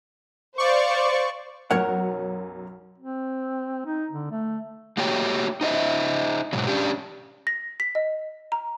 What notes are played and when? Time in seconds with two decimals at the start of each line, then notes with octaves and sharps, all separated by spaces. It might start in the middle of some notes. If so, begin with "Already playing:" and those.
0.58 C5 D5 F5 C#6
1.71 B1 F#2 A#4 C#5 F#5
2.98 C4
3.86 D#4
4.11 D3
4.32 A3
4.97 A3 A#3 F#4 G4 C#5 G5
5.61 D#4 C5 D#5 E5
6.53 G#2 B2 F#3
6.67 C#4 D4 G4
7.47 A#6
7.80 B6
7.95 D#5
8.52 A#5